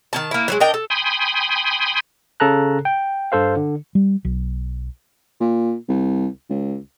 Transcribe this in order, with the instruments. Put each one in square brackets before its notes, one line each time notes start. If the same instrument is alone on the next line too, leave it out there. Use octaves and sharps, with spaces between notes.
[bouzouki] D#3 C#4 A5
A#3 E4
E3 F#3 G#3
D4 A#4 D#5 G5
A4
[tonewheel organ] G5 G#5 B5 C6 D#6
[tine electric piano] C#3 A4 A5 A#5 F#6
G5
G2 A4 C5 F5
D3
[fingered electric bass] G3
B1
[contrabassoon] A#2
C2
C#2